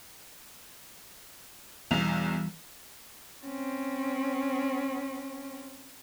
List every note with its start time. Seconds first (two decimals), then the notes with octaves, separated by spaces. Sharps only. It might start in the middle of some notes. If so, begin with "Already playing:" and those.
1.91 B1 E2 E3 G3 F7
3.45 C4 C#4